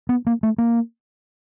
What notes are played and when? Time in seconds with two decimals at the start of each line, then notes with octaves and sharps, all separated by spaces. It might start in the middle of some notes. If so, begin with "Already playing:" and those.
0.09 B3
0.27 A#3
0.43 A3
0.58 A#3